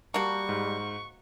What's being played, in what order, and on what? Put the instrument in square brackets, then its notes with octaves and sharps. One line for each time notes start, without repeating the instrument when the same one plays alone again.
[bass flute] G3 [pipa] A#3 F#4 [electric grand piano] A5 [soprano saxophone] C#6
[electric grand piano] G#2